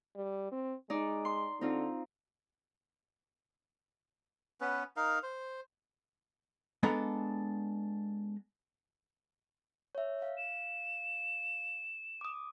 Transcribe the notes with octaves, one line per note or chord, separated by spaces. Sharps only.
G3
C4
G#3 D#4 D5
C6
D3 C4 D#4 F4
B3 C#4 B4
D#4 A#4 F5
C5
G#3 B3 D4 A4 F#5 A#5
C#5 E5
F5
E7
D6 D#6